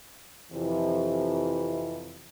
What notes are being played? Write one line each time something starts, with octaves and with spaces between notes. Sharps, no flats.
F2 C3 E3